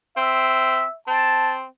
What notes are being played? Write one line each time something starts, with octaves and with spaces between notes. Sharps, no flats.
C4 E5
C4 A5